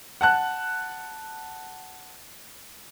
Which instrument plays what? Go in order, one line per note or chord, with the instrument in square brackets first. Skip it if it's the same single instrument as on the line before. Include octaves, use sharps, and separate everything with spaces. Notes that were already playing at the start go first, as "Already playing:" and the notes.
[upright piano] F#5 A5 F#6